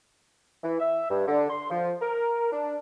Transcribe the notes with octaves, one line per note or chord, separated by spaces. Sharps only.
E3
E5
G2
D3
C6
F3
A#4
D4